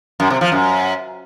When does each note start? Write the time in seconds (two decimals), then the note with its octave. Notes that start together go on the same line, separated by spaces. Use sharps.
0.20 F#2
0.30 C3
0.41 F3
0.52 F#2